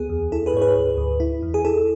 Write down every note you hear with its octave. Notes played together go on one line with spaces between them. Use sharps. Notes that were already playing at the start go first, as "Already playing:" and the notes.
Already playing: D2 B3 G#4
E2
E4 A4
G#4 B4
G#2 C#5
G#4 B4
D2
D2
E4
E2
G#4
E4 A4